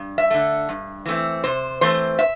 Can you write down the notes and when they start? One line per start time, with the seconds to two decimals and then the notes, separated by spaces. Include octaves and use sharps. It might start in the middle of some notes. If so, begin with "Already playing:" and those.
Already playing: G2
0.18 E5
0.30 D3 A3
0.69 G2
1.06 E3 A3 C4
1.44 C3 C5
1.81 E3 A3 C4 C5
2.19 E5